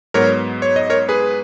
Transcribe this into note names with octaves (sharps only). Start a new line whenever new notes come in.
G#2 F#3 B3 A#4 C#5
C#5
D#5
A#4 C#5
G#4 B4